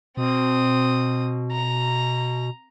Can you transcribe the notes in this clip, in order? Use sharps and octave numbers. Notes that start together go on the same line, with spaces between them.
B2 C4 D#6
A#5